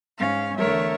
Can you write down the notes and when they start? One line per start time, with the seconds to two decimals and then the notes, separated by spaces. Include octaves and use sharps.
0.17 G#2 C#4 F5
0.56 E2 D3 A3 A#4 C#5 E5